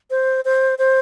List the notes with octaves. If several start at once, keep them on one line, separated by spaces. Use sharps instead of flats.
C5
C5
C5